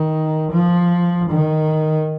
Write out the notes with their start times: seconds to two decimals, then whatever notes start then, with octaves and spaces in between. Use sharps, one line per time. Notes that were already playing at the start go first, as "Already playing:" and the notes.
Already playing: D#3
0.52 F3
1.29 D#3